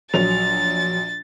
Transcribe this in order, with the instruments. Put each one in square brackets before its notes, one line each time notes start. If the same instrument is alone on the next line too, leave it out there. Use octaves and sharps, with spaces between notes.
[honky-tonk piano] A#1 F#3 F7 [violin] A6